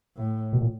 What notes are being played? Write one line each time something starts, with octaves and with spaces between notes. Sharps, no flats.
A2
B2
A#2